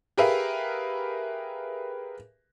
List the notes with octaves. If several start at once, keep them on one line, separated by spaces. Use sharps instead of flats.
G4 G#4 A#4 B4 E5 F5